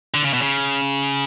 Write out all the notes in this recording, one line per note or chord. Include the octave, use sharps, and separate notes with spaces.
D3
C#3
B2
C#3